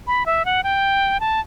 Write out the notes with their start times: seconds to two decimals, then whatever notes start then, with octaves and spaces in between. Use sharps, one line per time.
0.07 B5
0.26 E5
0.45 F#5
0.64 G5
1.20 A5